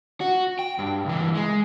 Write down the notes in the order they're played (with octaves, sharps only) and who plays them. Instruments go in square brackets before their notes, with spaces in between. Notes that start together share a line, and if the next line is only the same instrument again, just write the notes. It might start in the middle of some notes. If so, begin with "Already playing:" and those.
[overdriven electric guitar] F#4
G5
G2
C#2 E3
G#3